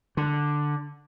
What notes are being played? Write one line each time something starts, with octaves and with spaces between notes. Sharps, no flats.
D3